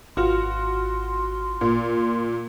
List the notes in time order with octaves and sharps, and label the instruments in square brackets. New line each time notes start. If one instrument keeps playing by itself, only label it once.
[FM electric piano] G#1 F4 F6 [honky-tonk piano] F#4 [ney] C6
[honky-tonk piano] A#2